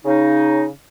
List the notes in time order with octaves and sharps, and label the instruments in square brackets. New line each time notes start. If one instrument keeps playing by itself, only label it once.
[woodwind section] C#3 D#4